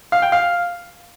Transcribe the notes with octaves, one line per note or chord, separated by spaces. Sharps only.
F5
G5
F5